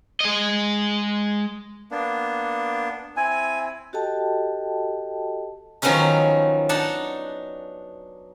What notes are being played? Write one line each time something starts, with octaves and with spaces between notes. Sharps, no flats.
G#3 D#5
A#3 B3 D4
C4 E4 G#5
F#4 G4 A4 D#5 G5 A5
D#3 F3 F#3 B3 C#4 D#4
D4 D#4 F#5 A5